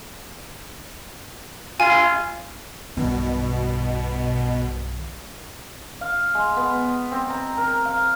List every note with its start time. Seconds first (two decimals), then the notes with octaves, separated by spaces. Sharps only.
1.80 F4 G#5
2.97 B1 G2 B2 D#3
6.01 F5
6.35 G#3
6.56 B3
7.11 C4
7.30 A#5
7.57 A#4
7.85 F5